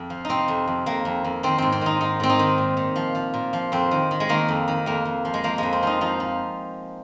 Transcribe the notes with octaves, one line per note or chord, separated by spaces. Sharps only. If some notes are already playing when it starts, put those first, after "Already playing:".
Already playing: F2
F3
C3 C4 D#4
F2
F2
F2 A#3
F2
F2
D#3 C4
G#2 C4
C4
D#3 D#4
G#2 D#4
G#2 C4
D#4
D#3
A#2
A#2
F3
F3
A#2
F3
F2 C4
D#3
D#3
G#3
D#3 A#3
F2
D#3
F2 A#3
F2
F3
G#3
F3 A#3
F2 G#3
C4
F3 D#4
F3 D#4
F3